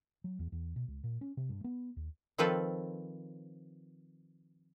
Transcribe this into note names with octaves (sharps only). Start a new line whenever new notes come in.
F#3
E2
E2
B2
C#2
A#2
C#4
C3
G2
B3
D#2
D#3 F3 C4 F4 A4 B4